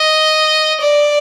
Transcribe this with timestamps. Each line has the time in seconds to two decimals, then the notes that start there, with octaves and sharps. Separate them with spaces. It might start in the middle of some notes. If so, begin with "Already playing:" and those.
Already playing: D#5
0.81 D5